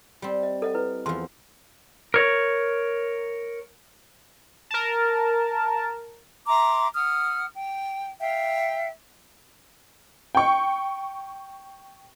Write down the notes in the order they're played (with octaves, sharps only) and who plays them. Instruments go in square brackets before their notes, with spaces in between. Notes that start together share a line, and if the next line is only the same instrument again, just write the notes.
[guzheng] G3 C4
[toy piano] D#5
A4 D#5 F#5
E4 B4
[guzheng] E2 F3 [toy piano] C6
[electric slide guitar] A#4 C#5
[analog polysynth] A#4 A5
[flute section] E5 A#5 C6 D6
F#5 D#6 F6
G5
E5 F5 G5
[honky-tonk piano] G5 C#6